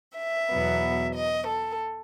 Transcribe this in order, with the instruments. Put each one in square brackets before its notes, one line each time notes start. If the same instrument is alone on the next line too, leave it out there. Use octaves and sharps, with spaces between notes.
[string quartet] E5
E2 B2 F#3 B3
D#5
A4